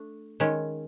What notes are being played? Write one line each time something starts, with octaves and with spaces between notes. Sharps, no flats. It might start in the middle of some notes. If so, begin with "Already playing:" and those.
Already playing: A3 D4
D#3 G#3 C#4